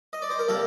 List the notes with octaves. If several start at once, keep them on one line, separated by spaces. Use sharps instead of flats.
D#5
D5
C5
A#4
C3 G3 A#3 A4